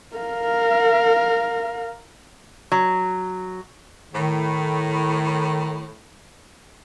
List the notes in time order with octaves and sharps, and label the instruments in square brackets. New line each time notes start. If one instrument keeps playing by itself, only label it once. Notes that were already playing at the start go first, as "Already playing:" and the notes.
[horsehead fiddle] A#4 F5
[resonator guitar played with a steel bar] F#3
[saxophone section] A2 [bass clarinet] D#3